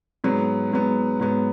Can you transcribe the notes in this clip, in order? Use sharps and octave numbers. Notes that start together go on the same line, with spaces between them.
G#2 F#3 B3
G#2 F#3 B3
G#2 F#3 B3